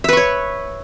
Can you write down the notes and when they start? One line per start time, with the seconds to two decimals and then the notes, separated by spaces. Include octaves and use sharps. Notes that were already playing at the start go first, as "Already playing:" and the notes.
0.04 E5
0.08 B4
0.13 C#6
0.17 C#5